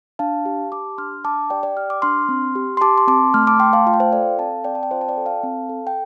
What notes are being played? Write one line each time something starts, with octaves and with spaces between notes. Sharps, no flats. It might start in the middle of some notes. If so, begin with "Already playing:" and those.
D4 F5 A5
G4
G4 A5 D6
D4 C6 F6
D4 A5 D6
G4 D5 G5
D5 G5
G4 F6
D6
D4 C6 F6
C4
G4
C6
G4 A5 D6
C6
C4 A5 D6
A3 C6 F6
A5 D6
A3 G5 C6
F5 A5
F4 F5
G5
C5 F5
A4 D5 G5
C4 F5 A5
C4 D5 G5
A5
G5
F4 C5 F5
A5
D5 G5
A4
F5 A5
C4
A4
G5